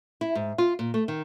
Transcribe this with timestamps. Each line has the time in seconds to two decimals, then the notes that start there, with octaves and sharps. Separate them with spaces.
0.21 E4
0.35 G#2
0.58 F4
0.79 A#2
0.94 A3
1.08 D#3